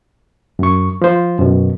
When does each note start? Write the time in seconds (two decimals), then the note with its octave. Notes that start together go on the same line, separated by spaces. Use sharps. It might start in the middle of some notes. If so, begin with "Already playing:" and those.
0.59 F#2 C#6
1.02 F3 C5
1.38 F#2 B2